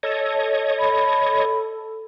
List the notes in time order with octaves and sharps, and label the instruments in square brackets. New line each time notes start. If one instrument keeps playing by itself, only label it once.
[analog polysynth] A4 [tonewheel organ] C#5 D#5
[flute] B5